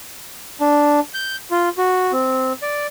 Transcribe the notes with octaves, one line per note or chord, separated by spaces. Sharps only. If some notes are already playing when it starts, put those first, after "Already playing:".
D4
G6
F4
F#4
C4
D5